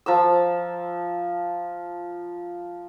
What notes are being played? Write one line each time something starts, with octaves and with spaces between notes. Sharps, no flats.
F3 A#5 E6